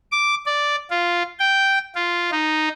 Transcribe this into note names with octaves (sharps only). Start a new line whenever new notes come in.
D6
D5
F4
G5
F4
D#4